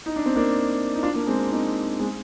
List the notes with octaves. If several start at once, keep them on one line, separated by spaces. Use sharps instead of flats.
D#4
D4
C4
A#3 D4
D#4
D4 F4
A#3 D4
G#3 C4
C4 D#4
G#3 C4